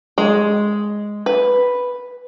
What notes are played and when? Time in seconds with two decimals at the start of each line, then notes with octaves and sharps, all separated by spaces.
0.18 G#3
1.26 B4